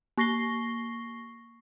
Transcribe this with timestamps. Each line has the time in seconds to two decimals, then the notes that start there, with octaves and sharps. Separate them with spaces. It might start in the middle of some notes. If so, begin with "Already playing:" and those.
0.18 A#3 C#6 A#6 C7 G7